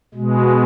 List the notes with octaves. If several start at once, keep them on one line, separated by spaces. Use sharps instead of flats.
B2 G#3